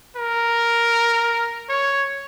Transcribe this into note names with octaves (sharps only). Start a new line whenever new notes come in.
A#4
C#5